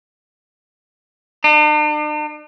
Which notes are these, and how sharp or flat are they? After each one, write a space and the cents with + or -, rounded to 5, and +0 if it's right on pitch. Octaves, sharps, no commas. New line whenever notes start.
D4 +45